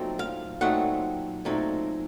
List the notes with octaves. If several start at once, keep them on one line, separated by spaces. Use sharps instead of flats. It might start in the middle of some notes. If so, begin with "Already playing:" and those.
Already playing: A#2 F#3 A3 C4 D#4
F5
A#2 F#3 A3 C4 D#4 F#5
A#2 F#3 A3 C4 D#4